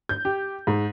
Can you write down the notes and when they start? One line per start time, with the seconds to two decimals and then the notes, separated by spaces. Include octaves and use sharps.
0.09 G6
0.25 G4
0.67 G#2